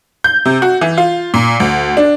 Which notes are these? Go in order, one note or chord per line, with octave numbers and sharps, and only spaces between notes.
G6
C3
F#4
E3
F4
A#2
D2
D4